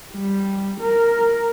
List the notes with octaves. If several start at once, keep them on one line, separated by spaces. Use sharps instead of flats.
G3
A#4